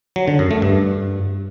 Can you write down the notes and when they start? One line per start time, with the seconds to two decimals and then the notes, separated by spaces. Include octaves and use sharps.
0.16 F#3
0.28 D3
0.39 F#2
0.51 A3
0.62 G2